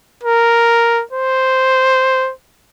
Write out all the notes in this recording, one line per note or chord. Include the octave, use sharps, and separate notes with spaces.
A#4
C5